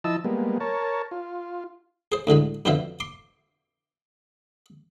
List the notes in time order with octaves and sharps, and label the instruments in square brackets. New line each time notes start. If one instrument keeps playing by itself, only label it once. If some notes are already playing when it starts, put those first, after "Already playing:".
[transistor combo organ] F3 E4 D#5 A5 E6
G3 G#3 A#3 B3
A#4 C#5 A5
F4
[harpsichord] G#4 C5
D2 A2 D3 G#3
F2 B2 D3 F4 C5 E5
C6 D6